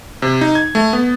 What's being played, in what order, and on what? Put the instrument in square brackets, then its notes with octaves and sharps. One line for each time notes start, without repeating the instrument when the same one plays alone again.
[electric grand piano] C3
D#4
G#6
A3
B3